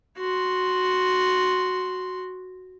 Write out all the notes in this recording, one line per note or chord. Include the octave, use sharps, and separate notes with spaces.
F#4 C6